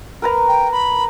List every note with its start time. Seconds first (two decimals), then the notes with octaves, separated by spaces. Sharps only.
0.22 A#4 B4 A#5
0.48 G5
0.72 B5